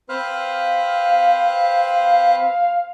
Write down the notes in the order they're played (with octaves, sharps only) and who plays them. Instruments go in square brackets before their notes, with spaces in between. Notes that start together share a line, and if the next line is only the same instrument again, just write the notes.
[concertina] C4 B4 C5 [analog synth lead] F5